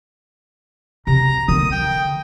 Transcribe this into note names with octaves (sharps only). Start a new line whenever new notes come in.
C3 A#5
D3 D#3 D#6
G5